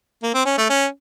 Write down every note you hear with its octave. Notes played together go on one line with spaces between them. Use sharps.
A#3
C4
C#4
A3
C#4